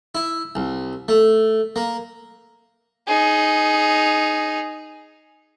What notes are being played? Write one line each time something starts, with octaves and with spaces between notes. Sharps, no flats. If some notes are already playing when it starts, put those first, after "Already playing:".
E4
C2
A3
A#3
D#4 G#4